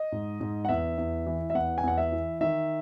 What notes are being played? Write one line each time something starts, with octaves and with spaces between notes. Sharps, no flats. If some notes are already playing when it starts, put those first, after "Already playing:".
Already playing: D#5
G#2
G#2
F#5
E2 E5
E2
E3
E5
E2 F#5
G#5
E2 F#5
E5
E3
D#3 E5